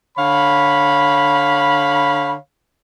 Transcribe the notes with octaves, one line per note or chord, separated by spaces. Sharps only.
D3 C#5 F5 B5